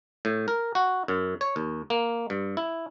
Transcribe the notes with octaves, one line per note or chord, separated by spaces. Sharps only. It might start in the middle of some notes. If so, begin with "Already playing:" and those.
A2
A#4
F#4
F#2
C#5
D#2
A#3
G2
E4